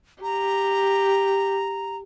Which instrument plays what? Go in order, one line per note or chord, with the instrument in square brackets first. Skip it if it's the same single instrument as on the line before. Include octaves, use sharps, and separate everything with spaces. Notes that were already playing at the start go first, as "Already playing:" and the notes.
[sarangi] G4 [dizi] A#5